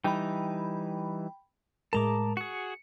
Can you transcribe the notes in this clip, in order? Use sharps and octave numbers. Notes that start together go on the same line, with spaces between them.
E3 G3 D#4 G5 B5
A2 G#3 A#4 A5 A#5 D6
F#4 G#4 C#7